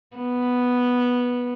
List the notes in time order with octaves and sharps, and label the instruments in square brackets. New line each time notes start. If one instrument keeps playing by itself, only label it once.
[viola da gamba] B3